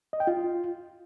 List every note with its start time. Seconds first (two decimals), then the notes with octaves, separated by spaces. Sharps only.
0.13 D#5
0.20 G5
0.27 F4